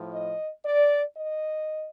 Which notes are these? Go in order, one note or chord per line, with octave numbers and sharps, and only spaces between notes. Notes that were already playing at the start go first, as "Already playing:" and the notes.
Already playing: A2 F3
D#5
D5
D#5